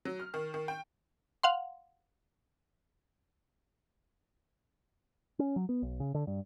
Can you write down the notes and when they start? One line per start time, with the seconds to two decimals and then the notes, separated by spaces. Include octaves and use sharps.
0.05 F#3
0.20 F6
0.34 D#3
0.54 D#3
0.68 G5
1.43 F5 F#5 C6
5.39 C#4
5.56 F#3
5.69 B3
5.82 B1
6.00 C#3
6.15 D3
6.27 G2